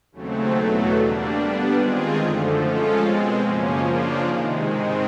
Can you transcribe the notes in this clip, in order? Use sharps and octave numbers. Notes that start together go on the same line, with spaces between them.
D#2 C#3 F#3 A3 C4
E2 B2 F#3 A3
D3 G3 A#3 D4
G3 B3 D4
D#3 G#3 C4 F4 G#4
F#2 D3 F3 A3
F3 G#3 C#4 F4 A4
B2 G#3 C4
F#2 C#3 F3 A#3 C#4
C#3 F3 A#3 D4 F4
C3 D#3 G#3
G#2 D#3 G#3 C4